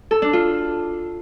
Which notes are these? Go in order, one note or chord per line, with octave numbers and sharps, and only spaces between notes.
A4
D4
F4